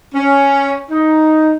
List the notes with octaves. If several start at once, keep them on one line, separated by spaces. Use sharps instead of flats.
C#4
D#4